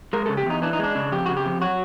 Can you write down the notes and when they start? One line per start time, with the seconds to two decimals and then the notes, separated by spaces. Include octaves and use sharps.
0.13 G#3 A#4
0.26 C#3 A4
0.37 G4
0.46 E2 D#4
0.62 E3 D4
0.73 D#4
0.79 G#3 D4
0.95 C#3
1.12 F2 G4
1.26 C#3 F#4
1.36 G4
1.45 F2
1.62 F#3 F#4